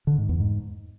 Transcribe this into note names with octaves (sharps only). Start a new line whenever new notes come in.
D3
G#2
E2
G#2